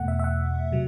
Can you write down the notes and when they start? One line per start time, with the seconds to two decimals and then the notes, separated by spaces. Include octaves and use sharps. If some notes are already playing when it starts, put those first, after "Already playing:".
Already playing: E2 B2 A3 F#5
0.08 E5
0.19 E5
0.24 F#5
0.72 C3 F#3